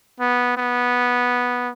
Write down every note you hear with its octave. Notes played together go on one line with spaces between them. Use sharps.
B3
B3